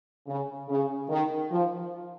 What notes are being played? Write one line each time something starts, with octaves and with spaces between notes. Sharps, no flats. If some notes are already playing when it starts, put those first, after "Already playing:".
C#3
C#3
D#3
F3